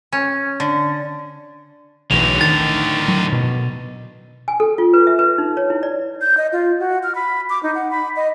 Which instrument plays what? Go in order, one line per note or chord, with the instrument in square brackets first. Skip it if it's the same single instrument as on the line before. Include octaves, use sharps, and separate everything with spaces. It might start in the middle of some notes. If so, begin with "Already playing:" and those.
[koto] C#4
D3
[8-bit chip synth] B1 E2 [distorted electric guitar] A2 D3 [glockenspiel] F7
[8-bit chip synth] D#3 [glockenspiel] A6
[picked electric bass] F#3
B2
[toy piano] G#5
A4
F4
B4
E5
B4
D#4
C#5
E4
D5
[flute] G6
D#5
F4
F#4
F6
B5
D6
D#4
F#5
B5
D#5